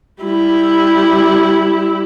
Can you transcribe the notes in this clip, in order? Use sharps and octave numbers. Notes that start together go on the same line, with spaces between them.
G3 E4